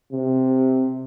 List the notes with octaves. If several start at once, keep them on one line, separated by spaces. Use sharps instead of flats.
C3